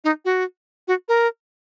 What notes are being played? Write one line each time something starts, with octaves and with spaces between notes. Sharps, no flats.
D#4
F#4
F#4
A#4